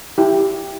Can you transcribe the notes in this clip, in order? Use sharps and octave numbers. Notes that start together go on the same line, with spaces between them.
E4 G4